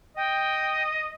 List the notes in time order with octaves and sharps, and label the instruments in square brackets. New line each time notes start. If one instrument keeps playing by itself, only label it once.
[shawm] D#5 [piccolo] G5